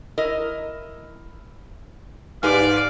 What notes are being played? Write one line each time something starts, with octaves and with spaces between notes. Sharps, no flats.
E4 A#4 D#5
G#2 G4 B4 D5 F5 G#5